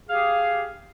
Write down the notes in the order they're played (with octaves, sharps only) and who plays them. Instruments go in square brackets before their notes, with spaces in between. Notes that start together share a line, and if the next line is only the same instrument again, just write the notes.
[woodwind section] G4 G#4 F5